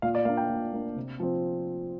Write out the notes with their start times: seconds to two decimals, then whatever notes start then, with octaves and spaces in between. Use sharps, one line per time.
0.02 A#2 F5
0.15 D5
0.25 A#3 D4 F5
0.37 G5
0.49 A#2
0.73 A#3 D4
0.96 C3
1.20 F3 C4